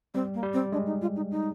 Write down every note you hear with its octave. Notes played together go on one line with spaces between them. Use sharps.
G3 C4
A#3
G3
C4
G#3 D4
D#4
F4
D#4
D#4